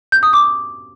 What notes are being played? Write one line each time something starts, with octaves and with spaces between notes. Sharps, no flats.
G6
D#6
D6